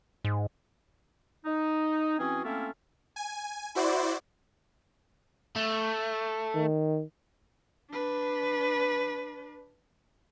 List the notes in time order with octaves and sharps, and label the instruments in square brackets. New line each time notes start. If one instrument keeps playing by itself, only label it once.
[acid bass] G#2
[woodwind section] D#4
E3 C4 C#4 F#4 G#4
A3 A#3 C4 C#4 E4 F4
[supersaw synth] G#5
E4 F#4 C5 D5
[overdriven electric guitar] A3
[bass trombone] D#3
[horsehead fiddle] D4 B4